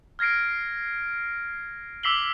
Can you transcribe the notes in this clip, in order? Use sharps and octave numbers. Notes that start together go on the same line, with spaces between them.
F6 G#6 A#6 C7 D7
D6 E6 B6 C7 F#7 G7